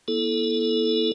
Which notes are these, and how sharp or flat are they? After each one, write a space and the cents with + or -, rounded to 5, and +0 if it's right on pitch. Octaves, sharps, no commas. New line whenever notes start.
B3 -35 E4 +0 A4 -15